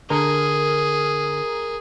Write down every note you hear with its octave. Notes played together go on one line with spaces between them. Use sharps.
D3 G#4 A#4